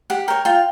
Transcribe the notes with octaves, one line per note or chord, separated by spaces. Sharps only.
G4 F#5
A#4 C#5 G5
F4 G5